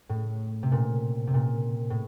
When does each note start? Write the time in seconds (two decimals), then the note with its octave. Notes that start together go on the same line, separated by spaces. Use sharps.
0.09 A2
0.63 C3
0.72 A#2
1.27 C3
1.34 A#2
1.90 A2